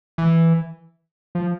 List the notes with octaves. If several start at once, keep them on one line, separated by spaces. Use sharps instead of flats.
E3
F3